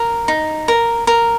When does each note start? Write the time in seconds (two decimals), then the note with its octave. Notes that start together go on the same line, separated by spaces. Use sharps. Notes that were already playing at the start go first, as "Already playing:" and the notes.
Already playing: A#4
0.28 D#4
0.68 A#4
1.07 A#4